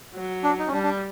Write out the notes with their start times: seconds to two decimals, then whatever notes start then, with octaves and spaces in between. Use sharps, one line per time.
0.15 F#3
0.44 D4
0.59 D#4
0.67 C#4
0.73 G3 D4
0.83 D4